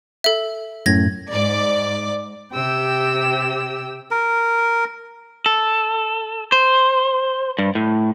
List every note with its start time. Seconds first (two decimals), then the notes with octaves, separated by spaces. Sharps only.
0.24 A4 E5
0.86 F#2 A2 G#6 A#6
1.31 G#2 D5
2.53 C3 G4 G5 E6
4.11 A#4
5.46 A4
6.52 C5
7.59 G2
7.75 A2